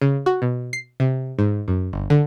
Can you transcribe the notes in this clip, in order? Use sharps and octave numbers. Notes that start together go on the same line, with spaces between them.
C#3
F#4
B2
C7
C3
G#2
F#2
G1
D3